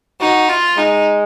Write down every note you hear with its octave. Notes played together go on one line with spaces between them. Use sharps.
D#4 F#4
F4
G#3 D#4